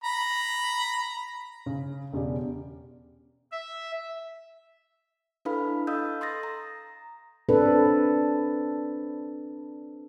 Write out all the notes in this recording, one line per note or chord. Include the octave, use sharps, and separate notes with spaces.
A#5 B5
C#3
E1 C#3 G4 D5
E5
D4 E4 A4 B4 F5 B5
A4 D#5 F5 D#6 E6 G6
C6 D#6 A6 A#6
A#5
C4 D4 A4 B4